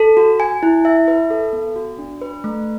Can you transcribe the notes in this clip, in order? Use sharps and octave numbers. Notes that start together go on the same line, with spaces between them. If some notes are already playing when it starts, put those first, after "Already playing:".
Already playing: A4
F#4
G#5
E4
E5
B4
A4
B3
F#4
D4
B4
A3